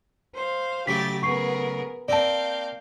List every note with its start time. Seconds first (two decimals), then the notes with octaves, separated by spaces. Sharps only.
0.35 C5 F5
0.87 C#3 F#3 A3 G4 A6 B6
1.23 B3 G#4 A#4 C#6 C7
2.08 A#3 C4 D5 F5 A5 G6